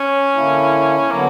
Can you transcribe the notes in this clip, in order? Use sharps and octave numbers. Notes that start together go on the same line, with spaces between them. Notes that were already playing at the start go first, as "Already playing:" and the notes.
Already playing: C#4
D3 A#3 E4
D3 F#3 A#3 B3